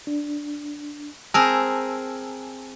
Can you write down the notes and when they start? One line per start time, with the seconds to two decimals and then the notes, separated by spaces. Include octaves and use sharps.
0.07 D4
1.34 C4 G#4 A#4 G#5 A5 E6